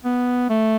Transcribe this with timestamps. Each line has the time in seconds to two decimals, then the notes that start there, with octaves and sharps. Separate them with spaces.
0.05 B3
0.50 A3